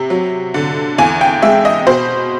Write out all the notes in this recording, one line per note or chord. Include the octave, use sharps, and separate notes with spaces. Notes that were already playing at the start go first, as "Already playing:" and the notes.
Already playing: C3
F#3
D3
E2 G#5
G5
G#3 E5
D#5
B2 C5